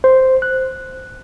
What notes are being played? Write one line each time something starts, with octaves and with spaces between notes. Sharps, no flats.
C5
F#6